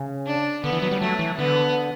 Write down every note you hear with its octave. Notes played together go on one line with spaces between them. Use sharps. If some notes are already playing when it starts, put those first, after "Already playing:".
Already playing: C#3
D4
D3 B3
E3
F#3
G3
F#3 A3
E3
D3 B3